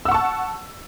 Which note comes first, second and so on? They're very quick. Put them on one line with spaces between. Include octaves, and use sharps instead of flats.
E6 F#5 C#6 A5